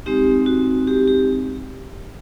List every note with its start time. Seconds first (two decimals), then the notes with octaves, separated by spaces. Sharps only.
0.06 G#3 C4 D#4 G4
0.46 F#4
0.87 G4
1.08 G4